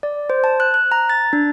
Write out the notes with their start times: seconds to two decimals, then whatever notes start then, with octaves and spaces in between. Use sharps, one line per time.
0.03 D5
0.30 C5
0.44 A5
0.60 F#6
0.74 F#6
0.92 A#5
1.10 A6
1.33 D4